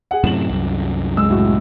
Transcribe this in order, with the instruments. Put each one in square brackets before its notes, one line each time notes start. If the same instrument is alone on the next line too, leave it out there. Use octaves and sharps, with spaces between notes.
[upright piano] G#4 F#5
[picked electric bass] F#2 A2 C3 [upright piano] E7 F#7
[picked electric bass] C2 F#2
[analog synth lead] G#3 [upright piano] E6
[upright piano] A2 F#4